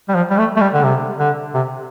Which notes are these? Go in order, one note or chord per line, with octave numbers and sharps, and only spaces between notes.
G3
F3
G3
A3
A3
G3
D3
C3
D3
C3